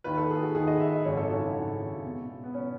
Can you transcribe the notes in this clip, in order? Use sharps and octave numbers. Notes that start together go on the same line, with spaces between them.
D#2 D#3 B4
A4
G#4
F#4
D#2 D#3 G#4
D#5
E5
D#5
G#1 F#2 C#3 C#5
A4
F#4
E4
G#1 F#2 C#3
E1 E2 B2
B3
B2 C#4